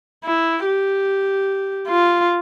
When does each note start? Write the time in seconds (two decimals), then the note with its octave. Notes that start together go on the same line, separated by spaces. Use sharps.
0.24 E4
0.66 G4
1.89 F4